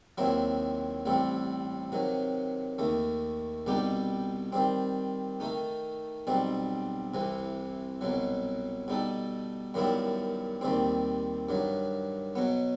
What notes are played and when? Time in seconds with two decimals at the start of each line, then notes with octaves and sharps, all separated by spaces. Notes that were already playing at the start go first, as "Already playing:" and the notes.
0.18 D#2 D#3 F#3 C4 E4
1.06 A1 A2 G3 C4
1.92 C3 D#3 F#3
2.79 D#2 D#3 A3
3.66 C2 B2 G3 D#4 G4
4.52 D#3 G3 C4
5.40 D#3 A3 D#4
6.27 B1 B2 G3 C4
7.14 C2 C3 E3
8.01 C2 B2 F#3
8.88 B2 G3 D#4 A4
9.74 F#2 D#3 G3 B3 E4
10.61 D#2 D#3 G3 C4
11.49 G2 D#3 F#3
12.35 B2 F#3 B3